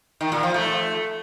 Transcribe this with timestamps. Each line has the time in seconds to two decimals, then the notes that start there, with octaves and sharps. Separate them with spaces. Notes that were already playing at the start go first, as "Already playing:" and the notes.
0.21 D#3
0.32 A#2
0.43 F3
0.54 A3